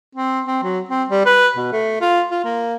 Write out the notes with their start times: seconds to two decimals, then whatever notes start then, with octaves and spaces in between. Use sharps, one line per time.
0.15 C4
0.46 C4
0.63 F#3
0.89 C4
1.09 G3
1.26 B4
1.56 B2
1.72 A3
2.01 F4
2.31 F4
2.45 A#3